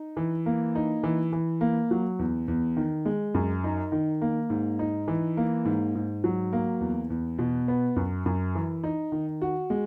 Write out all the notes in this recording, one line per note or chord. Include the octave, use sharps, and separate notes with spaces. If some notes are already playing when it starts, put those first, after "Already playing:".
Already playing: D#4
E3
A#3
D#4
E3
E3
A#3
F#3
E2
E2
D#3
G#3
F#2
D#4
D#3
A#3
G#2
D#4
E3
A#3
G#2
G#2
F#3
A#3
E2
E2
B2
B3
F#2
F#2
E3
D#4
D#3
F#4
G#3